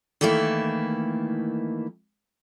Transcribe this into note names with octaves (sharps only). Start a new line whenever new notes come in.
D#3 E3 A3 A#3 E4